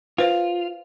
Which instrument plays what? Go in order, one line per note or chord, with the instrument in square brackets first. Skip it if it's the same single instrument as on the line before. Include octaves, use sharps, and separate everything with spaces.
[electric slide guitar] F4 [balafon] B4 C5 F5